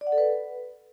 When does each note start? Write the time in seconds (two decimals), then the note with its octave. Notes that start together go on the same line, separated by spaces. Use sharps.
0.01 D5
0.07 F#5
0.12 A4
0.18 B4